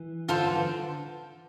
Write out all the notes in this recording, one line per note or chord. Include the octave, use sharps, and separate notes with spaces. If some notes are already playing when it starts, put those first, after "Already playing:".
Already playing: E3
D3 F4 A4 C5
E3
D3